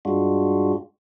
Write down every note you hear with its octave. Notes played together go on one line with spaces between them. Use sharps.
G2 G#3 D4 F4 F#4